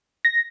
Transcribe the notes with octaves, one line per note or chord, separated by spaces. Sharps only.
A#6